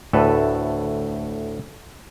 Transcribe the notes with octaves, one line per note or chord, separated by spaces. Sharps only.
D2 A2 A4 B4